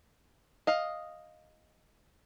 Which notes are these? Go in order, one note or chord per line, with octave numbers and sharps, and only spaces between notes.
D#5 F5